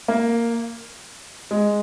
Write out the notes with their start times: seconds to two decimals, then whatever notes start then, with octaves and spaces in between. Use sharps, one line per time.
0.08 A#3
1.51 G#3